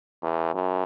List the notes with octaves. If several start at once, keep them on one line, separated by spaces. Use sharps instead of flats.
E2
F#2